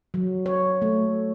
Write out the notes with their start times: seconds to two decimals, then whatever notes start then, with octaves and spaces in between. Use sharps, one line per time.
0.14 F#3
0.46 C#5
0.82 A3